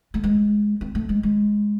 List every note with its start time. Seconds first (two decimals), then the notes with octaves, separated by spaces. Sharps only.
0.14 A3
0.24 G#3
0.81 C4
0.95 A3
1.09 G#3
1.23 G#3